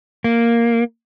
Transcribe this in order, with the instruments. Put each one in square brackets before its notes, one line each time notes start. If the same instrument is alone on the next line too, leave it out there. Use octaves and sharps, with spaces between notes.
[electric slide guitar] A#3